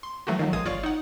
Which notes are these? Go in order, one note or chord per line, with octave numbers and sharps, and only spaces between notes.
C6
E3 F#3 A3 A#3 F#4
D#3 F3 F#3
A#1 G#3 F5 D#6 G#6 D#7
G1 F4 C#5 D5 F5 C#6
D#4 F#5